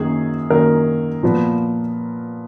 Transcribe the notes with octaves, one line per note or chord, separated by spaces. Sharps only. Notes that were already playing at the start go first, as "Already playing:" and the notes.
Already playing: F#2 D#3 F#3 A#3 G#4
F#2 D#3 F#3 A#3 A#4
A#2 F3 B3